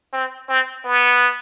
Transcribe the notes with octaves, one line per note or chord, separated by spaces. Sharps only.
C4
C4
B3